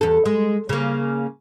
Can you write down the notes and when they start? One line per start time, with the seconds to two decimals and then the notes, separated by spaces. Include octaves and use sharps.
0.01 E2 A4
0.25 G#3
0.69 C#3 A#3